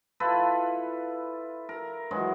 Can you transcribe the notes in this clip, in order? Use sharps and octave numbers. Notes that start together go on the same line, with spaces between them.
E4 F4 A4 B4
A#4
D#3 E3 F#3 G#3